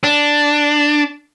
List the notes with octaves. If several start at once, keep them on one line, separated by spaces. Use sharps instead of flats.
D4